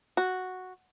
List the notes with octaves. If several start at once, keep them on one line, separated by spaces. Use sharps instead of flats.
F#4